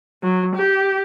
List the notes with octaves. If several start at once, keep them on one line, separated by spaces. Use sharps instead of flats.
F#3
G4